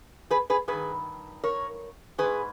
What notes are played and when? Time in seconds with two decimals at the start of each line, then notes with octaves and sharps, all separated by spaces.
0.31 G#4 B4
0.50 G#4 B4
0.68 G2 D#3 G#4 B4
1.44 A#4 C#5
2.18 G#2 D#3 G#4 B4